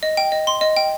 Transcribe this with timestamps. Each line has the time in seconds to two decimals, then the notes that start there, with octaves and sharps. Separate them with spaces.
0.03 D#5
0.17 G5
0.32 D#5
0.47 C6
0.61 D#5
0.77 G5